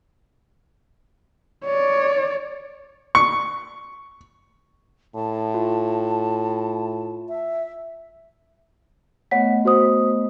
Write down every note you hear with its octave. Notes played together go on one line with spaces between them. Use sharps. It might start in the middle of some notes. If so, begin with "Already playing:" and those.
C#5 D5
C#6
A2 A5
F4
E5
A3 B3 C#5 D#5 F#5 B6
F#4 C5 D#6